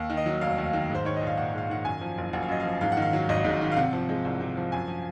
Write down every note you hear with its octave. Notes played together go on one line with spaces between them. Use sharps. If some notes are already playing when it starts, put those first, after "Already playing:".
Already playing: D#2
D#3
D#5
F#3
F1 F5
D#2
D#3
G#2 C5
D#3 C#5
A#1 D#5
F5
A#1 F#5
G#2 F5
D#3 F#5
F#2 G#5
F3
F#1
F#1 F#5
F5
F#2 D#5
F5
F3
G#2 F5
D#3 F#5
F5
F#3
G#1 D#5
G#2
D#3
F5
C3 F#5
F3
G#3
C2
C3
F3
F#2 G#5
F3